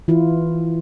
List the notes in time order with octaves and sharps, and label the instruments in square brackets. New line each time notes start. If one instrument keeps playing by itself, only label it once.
[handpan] E3 E4 F4